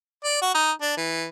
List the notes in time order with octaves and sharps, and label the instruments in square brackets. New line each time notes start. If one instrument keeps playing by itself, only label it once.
[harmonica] D5
F#4
D#4
D4
E3